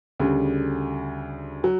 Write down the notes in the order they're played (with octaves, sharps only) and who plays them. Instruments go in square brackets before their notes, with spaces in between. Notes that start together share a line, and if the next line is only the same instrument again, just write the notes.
[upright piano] D2 C#3 G3
F#3